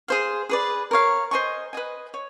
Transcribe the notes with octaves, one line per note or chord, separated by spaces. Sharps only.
G#4 C5 F5
G#4 B4 D5
A#4 C#5 F5
C5 D#5 G#5 C#6
B4 D#5 G#5
C#5